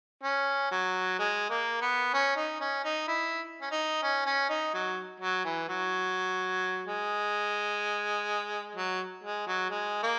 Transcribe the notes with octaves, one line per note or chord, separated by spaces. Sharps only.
C#4
F#3
G#3
A#3
B3
C#4
D#4
C#4
D#4
E4
C#4
D#4
C#4
C#4
D#4
F#3
F#3
E3
F#3
G#3
F#3
G#3
F#3
G#3
A#3